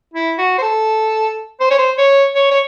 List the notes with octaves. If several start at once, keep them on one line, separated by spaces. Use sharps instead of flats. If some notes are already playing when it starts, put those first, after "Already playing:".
E4
F#4
C5
A4
C5
C#5
C5
C#5
C#5
C#5